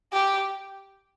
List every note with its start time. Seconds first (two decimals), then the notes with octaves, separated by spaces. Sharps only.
0.13 G4